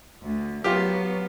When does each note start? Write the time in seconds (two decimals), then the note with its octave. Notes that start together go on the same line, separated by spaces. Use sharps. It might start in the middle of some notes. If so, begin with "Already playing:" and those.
0.22 D2
0.64 F#3 B3 F4 G4